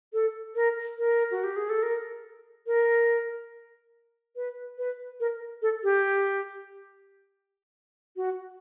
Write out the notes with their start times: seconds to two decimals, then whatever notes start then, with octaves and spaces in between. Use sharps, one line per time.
0.13 A4
0.55 A#4
0.98 A#4
1.31 F#4
1.44 G4
1.56 G#4
1.69 A4
1.83 A#4
2.67 A#4
4.36 B4
4.78 B4
5.20 A#4
5.62 A4
5.84 G4
8.16 F#4